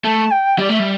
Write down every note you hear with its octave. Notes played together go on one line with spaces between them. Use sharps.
A3 A5
G5
G3 D5
A3 E5
G3